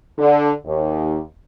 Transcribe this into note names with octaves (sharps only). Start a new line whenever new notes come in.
D3
D#2